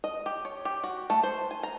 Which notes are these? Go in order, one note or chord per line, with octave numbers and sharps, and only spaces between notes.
D#5
G4
C#5
G4
F#4
A3
C5
G#5
A#5